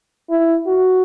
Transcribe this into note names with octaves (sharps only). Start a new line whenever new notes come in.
E4
F#4